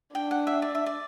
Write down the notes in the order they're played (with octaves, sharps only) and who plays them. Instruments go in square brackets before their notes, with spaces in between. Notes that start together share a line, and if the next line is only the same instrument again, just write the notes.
[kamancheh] D4 [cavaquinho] G5
[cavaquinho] F#5
E5
D5
E5
D5